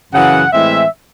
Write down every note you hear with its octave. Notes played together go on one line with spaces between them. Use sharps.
F#2 C#3 E3 F#5
A2 E3 G#3 C4 E5